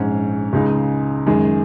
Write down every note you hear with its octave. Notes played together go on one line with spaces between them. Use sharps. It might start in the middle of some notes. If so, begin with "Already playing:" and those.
Already playing: A#1 G#2 G#3 C#4
C#2 C#3 G#3 D#4
F#2 D#3 G#3